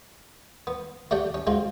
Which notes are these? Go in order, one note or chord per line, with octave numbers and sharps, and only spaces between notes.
B3
A3 D4 G4 D5 F#5 G5
C#4
G#3 C4 F4 F#4